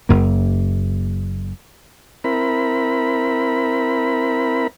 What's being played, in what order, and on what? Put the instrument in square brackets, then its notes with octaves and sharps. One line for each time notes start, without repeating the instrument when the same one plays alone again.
[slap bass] F#1 F#2 A#3
[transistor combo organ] C4 E4 A#4 B5